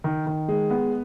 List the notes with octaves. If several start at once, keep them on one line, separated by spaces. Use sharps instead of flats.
D#3
D#3
G#3
B3